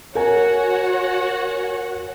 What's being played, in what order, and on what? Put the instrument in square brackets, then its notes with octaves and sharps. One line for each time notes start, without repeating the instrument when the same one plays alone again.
[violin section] F#4 C#5 F#5 [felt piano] A#4 G#5